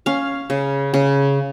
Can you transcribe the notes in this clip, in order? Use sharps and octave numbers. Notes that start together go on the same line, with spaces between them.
C#4 F5
C#3
C#3